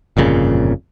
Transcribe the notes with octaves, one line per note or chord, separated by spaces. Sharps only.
G1 F2 A#2 C#3